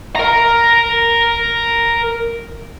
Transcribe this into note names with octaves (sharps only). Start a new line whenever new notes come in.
A#4 A#5